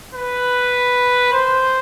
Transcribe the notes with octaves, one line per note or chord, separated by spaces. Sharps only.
B4
C5